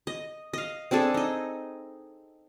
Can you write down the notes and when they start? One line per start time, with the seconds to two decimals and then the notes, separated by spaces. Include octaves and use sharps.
0.07 D#5
0.53 D#5 F5
0.91 C4 D4 G#4 A4
1.14 D#4 D#5